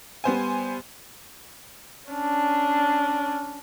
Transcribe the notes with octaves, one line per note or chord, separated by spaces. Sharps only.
G3 B3 C5 G#5
C#4 D4